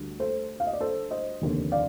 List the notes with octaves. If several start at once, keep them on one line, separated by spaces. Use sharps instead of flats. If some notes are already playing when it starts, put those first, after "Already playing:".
Already playing: D2 D3 G3
A4 C5
F5
D#5
D5
A4 C5
C5 D#5
F1 D#2 D3
D5 F5